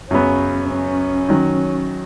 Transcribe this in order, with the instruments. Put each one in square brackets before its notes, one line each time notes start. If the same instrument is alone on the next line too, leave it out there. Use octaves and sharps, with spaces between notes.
[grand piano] F#2 C#3 F#3 B3 [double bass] C#4
[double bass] C#4
[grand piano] D#3 F#3